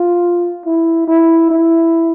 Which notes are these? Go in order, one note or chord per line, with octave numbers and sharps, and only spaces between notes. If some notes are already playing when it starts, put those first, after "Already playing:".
Already playing: F4
E4
E4
E4